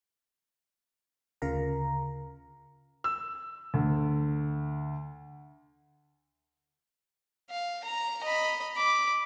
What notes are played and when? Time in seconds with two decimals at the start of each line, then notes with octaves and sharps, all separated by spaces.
1.42 D2 C#3 F4 A#4 A#5
3.04 E6
3.74 D2
7.50 F5
7.84 A#5
8.24 D#5 B5
8.76 B5 D6